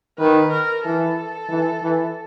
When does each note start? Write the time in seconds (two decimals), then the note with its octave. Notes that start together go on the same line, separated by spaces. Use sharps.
0.19 D#3 B4
0.51 A#4
0.84 E3 A4
1.50 E3
1.83 E3